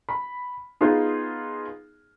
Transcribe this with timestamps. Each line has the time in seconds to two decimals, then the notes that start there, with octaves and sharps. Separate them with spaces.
0.09 B5
0.81 B3 D#4 F4 G#4